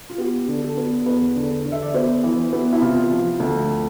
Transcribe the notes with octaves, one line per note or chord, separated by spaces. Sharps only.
F4
B3 G4
D3
A4
B3
E2 B4
D3
D3
E5
D5
B3 C5
E3
B3
E4
C3 F4
F3
D2